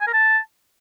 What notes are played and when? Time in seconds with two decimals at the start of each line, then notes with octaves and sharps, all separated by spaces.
0.01 G#5
0.07 A#4
0.13 A5